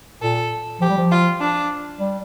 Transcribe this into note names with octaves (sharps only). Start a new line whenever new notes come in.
A#2 A4
F3 G4
G3
F3
F4
D4
G3